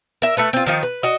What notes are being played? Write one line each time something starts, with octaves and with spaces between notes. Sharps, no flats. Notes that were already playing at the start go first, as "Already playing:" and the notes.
A#4 E5
A3 A4 B4
C4 F4
D#3 F3 D#4
B4
F#4 D#5